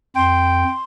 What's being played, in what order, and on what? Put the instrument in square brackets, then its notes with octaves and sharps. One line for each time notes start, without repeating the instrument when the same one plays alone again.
[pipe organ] F2 [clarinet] G5 [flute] C6